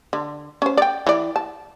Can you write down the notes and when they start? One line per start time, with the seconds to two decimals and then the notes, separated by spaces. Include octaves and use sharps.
0.13 D3
0.62 C#4 C5
0.77 D5 G5
1.07 E3 D5
1.36 A5